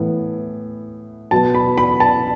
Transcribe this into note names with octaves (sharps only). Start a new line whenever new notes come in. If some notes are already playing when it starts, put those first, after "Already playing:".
Already playing: A2 E3 B3
B2 F#3 B3 A5
B5
B5
A5